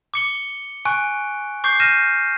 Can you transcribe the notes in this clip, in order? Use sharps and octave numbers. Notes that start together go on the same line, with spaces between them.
D6 C#7 G7
G#5 C#6 F#6 D7
C#6 D6 G6 C7
F6 G6 A#6 D#7 E7